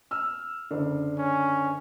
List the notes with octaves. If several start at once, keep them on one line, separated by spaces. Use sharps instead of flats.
E6 F6
F#1 D3
C#4